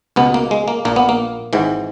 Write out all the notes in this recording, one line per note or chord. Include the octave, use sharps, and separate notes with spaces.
C#2 B2 B3
A#3
G#3
A#3
A#1 A#2 A#3
B3
A#3
G#1 G#2 E3